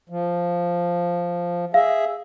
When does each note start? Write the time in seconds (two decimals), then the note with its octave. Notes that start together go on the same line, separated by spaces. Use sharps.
0.09 F3
1.74 G#4 E5 F5